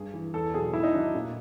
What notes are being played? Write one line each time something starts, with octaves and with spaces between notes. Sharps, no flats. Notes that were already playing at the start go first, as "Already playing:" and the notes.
Already playing: G2 G#4
E3
E2 A4
B2 F#3 G#4
G#2 E4
D#4
D#3 F#3 D4
A#2